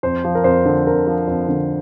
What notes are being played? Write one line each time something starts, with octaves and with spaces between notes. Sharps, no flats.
F2 C5
F3
A#4
F2 C5
D3
F2 A#4
F3
F2
D3